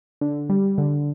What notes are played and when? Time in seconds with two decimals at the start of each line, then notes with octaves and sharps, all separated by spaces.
0.21 D3
0.50 G3
0.78 D3